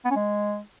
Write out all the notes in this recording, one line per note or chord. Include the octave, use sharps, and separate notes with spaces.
B3
C#4
G#3